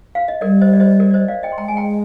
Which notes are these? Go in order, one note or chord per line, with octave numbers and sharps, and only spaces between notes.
F5
D#5
G3 A#4 D5
C5 D#5
D5
C5 D#5
A#4 D5
D5
C5 D#5
D5 F5
D#5 G5
C6
G#3 G5 A#5
G#5
G5 A#5